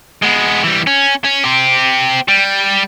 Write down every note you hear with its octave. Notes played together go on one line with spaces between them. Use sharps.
G#3 B3
E3 G3
C#4
C#4
C4 G4
G3